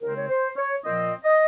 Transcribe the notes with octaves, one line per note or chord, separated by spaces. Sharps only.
D#2 C#3 G#3 C4 A#4
C#5
C5
C#5
A#2 F3 C4 D#5
D#5